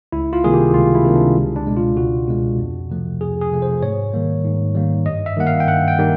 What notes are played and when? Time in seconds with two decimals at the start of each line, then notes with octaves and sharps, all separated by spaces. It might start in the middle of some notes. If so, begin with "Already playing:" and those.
0.12 C#2 E4
0.33 F4
0.44 C3 D#3 G3 A#3 G#4
0.54 G4
0.74 C#2 F4
0.95 E4
1.04 C3 D#3 G3 A#3
1.16 D4
1.36 C#2
1.56 D4
1.67 B2 G#3
1.77 F4
1.97 C#2 F#4
2.28 B2 G#3
2.59 F2
2.90 C3 F3 A3
3.21 F2 G#4
3.41 G#4
3.52 C3 F3 A3
3.62 C5
3.82 G#2 C#5
4.14 D#3 G3 A#3
4.45 G#2
4.75 D#3 G3 A#3
5.06 G2 D#5
5.26 E5
5.37 D#3 G3 A#3 F#5
5.47 F5
5.60 G5
5.68 G2 F#5
5.88 G5
5.98 D#3 G3 A#3